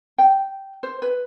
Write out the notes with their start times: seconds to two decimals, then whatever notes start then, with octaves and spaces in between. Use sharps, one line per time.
0.18 G5
0.83 C5
1.02 B4